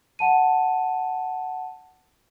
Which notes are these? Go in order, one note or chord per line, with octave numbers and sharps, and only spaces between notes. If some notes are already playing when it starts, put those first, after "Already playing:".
F#5 A5 D#7